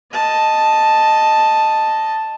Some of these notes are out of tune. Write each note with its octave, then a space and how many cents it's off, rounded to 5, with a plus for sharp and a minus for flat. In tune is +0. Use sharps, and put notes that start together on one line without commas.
D#5 +0 A5 +0